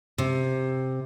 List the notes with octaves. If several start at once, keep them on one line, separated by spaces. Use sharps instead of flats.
C3